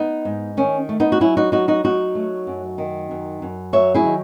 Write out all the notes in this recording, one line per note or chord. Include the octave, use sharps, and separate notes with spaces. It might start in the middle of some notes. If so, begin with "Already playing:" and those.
Already playing: B3 D#4
G#2
D#3 C#4
A3
B3 D#4
F#4
F#3 C#4 E4
D#4 F#4
F#3 D#4 F#4
D#4 F#4
F#3 D#4 F#4
A3
F#2
D#3
F#2
F#2
F#3 C#5 E5
E4 G#4
D#3